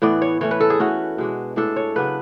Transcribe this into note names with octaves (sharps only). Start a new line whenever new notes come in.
A2 E3 B3 D5
C#5
E3 A3 C#4 C#5
B4
A4
G#4
E3 A3 C#4 F#4
B2 G#3 D4
A2 G#3 D4 A4
C#5
C#3 F#3 B3 D4 B4